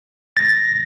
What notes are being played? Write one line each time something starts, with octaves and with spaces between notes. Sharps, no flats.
A6 A#6